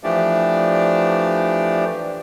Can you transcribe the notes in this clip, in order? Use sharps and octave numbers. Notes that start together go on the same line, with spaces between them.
E3 F3 A3 D4 G4 D5